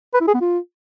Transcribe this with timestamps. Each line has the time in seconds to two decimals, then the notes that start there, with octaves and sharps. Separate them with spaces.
0.14 B4
0.21 E4
0.27 G#4
0.34 B3
0.41 F4